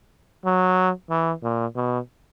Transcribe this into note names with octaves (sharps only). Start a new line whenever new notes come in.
F#3
E3
A#2
B2